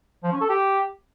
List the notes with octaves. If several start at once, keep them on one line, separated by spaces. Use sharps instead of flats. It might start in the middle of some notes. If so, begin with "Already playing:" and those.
F3
C#4
A4
G4